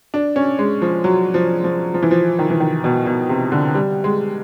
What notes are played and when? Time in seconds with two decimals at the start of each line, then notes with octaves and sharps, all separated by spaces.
0.14 D4
0.36 C#4
0.59 G#3
0.82 F3
1.04 F#3
1.34 F3
1.64 F3
1.94 F3
2.02 E3
2.11 F3
2.39 D#3
2.50 E3
2.60 D#3
2.84 B2
3.06 B2
3.29 C3
3.52 D3
3.75 G3
4.04 G#3